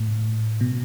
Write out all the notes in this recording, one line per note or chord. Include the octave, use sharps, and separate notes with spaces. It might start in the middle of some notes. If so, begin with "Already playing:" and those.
Already playing: A2
B2